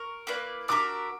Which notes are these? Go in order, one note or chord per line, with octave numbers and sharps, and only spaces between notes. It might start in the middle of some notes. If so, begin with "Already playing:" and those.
Already playing: A#4 C#6
A#3 E4 B4 D5
D4 F#4 A#4 E5 D6